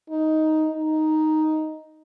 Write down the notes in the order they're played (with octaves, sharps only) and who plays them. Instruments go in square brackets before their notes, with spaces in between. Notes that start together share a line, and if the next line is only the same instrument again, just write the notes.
[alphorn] D#4
D#4